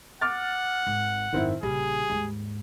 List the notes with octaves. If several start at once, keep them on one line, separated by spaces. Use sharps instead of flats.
F#5 D6 F6 A6
G#1
G#1 F#2 D#3 C4 E4
A#1 C#3 G3 G#4
D#2 G#2